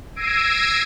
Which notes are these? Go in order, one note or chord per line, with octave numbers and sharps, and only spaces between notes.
E6 G#6 A#6 C7 D7 D#7